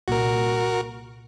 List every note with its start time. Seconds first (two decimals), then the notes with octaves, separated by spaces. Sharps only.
0.08 C2 A#2 F#4 A#4